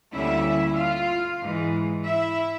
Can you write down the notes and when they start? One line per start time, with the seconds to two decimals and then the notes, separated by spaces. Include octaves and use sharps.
0.13 D2 D3 G3 A#3 C#4 E4 E5
0.76 F4 F5
1.40 G#2 E3 G#3
2.03 E4 E5